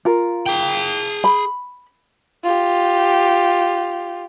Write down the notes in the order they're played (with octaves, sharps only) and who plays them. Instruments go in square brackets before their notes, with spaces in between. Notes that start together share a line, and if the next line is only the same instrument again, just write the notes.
[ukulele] F4 A#4
[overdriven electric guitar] G#4 G5
[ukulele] B5
[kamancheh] F4 G4